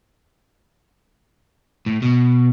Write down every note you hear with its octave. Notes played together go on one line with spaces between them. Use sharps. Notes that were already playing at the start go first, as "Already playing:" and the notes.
A2
B2